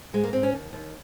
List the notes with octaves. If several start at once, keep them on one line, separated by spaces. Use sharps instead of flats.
G#2 G#3
A#3
G#2 C4
C#4
D#2
D#2